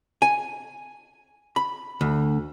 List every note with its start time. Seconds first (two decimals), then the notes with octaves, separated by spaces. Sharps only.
0.22 G#5
1.56 B5
2.01 D2